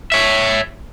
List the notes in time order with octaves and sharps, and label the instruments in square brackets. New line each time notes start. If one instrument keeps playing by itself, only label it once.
[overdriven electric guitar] C#5 E5